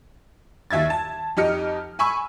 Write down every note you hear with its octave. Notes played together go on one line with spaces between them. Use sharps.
D#2 E5 G#6 A6
A5
F2 D#4 G4 D#5 F6 C#7
G#5 B5 C#6 E6